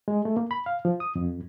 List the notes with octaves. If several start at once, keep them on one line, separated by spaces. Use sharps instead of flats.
G#3
A3
A#3
B5
F5
F3
D#6
F2